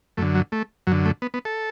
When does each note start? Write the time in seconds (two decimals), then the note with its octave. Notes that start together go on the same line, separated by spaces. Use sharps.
0.17 F#2 D3 A3
0.35 F#3
0.52 A3
0.87 F#2 D3 F#3
1.05 A3
1.22 B3
1.34 B3
1.45 A4